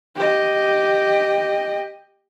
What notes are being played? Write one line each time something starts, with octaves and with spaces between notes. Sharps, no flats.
G4 D#5